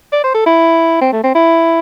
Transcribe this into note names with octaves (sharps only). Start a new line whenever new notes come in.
D5
C5
A4
E4
C4
A3
C4
E4